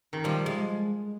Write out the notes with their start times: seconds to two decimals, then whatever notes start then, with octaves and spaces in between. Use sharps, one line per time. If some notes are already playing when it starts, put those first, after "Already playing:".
0.13 D#3
0.24 F3 G3
0.46 G#3